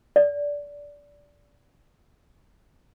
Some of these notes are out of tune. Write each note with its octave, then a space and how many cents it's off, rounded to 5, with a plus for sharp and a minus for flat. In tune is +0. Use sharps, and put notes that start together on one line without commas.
D5 -15